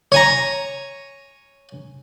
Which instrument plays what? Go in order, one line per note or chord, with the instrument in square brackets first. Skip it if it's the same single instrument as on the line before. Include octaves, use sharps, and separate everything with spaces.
[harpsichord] C#5 G#5 A#5